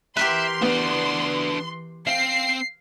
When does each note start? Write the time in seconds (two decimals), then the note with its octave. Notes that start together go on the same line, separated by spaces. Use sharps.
0.17 E3 G4 A#4 B4 E5 C6
0.62 B3 D4 F#4
2.07 C4 F5 C7